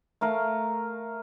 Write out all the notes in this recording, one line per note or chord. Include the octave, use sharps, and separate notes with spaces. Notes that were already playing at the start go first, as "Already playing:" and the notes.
A3 A#4 F5